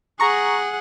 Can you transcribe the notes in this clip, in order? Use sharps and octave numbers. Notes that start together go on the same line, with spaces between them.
G#4 F#5 A#5 C#6